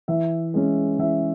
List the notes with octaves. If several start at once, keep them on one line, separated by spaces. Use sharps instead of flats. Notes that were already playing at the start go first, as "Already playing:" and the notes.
E3 E5
G#3 C#4
E3 E5